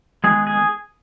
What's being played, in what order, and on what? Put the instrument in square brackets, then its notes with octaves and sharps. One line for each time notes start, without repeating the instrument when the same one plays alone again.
[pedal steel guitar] D#3 G#3 B3 G#4
G#4